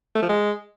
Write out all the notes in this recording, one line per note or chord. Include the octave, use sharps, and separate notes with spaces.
A3
F3
G#3